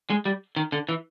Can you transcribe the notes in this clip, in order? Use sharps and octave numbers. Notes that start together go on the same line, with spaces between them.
G#3
G3
D#3
D3
E3